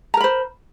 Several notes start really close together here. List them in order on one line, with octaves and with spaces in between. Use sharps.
A#5 A#4 B5 C5